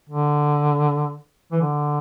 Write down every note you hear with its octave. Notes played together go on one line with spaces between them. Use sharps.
D3
E3
D3